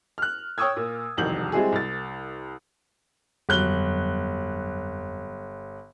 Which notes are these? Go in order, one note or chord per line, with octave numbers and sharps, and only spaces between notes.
F6 F#6
C#5 G5 C#6 D#6 E6 G#6
A#2
E1 C2 F2 D#3 G6 F#7
G3 G#3 C4 E4 F#4 G#4
C2 A6
G1 F2 F#3 F#6 G7